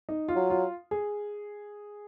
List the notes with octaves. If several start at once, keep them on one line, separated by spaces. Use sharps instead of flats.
D#4
F4
F#3
F4
G#4